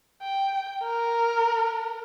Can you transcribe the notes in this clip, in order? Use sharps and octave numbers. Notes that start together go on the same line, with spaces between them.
G5
A#4